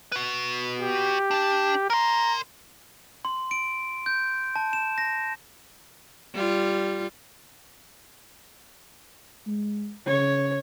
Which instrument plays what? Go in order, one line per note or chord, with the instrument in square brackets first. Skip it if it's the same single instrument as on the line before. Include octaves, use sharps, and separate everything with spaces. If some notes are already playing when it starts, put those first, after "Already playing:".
[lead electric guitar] F#4 B4
[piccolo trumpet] G4
[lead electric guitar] D4 A5
[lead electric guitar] A#4 C6 [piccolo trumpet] A#5
[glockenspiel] C6
D7
G6
A5
E7
A#6
[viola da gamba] G3 F4
[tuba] G#3
[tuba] C#3 [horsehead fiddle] C#5